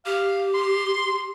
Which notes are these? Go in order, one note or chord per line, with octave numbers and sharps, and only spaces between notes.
G4 F5
C6